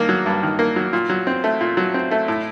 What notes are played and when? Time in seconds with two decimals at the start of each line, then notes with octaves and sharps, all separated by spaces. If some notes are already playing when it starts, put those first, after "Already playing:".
Already playing: G2 D#3 A#3
0.09 F#3
0.26 G2
0.43 D#3
0.59 A#3
0.76 F#3
0.93 A#2
1.09 F#3
1.27 C4
1.44 A3
1.61 A#2
1.77 F#3
1.94 C4
2.11 A3
2.28 A2